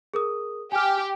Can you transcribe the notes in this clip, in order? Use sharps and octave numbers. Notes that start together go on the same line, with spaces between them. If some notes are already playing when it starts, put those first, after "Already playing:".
G#4 A#4 D#6
G4 G#5 F6